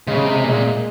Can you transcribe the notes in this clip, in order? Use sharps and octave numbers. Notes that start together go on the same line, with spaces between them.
C#3 G#3
C3
A#2 G#3